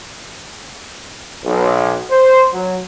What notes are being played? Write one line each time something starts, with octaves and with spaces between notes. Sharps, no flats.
B1
C5
F#3